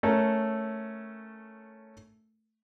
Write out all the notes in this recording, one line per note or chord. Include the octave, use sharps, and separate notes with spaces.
A3 C#4 A4 A#4